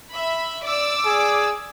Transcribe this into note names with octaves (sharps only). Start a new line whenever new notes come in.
E5 B5
D5 D6 E6
G#4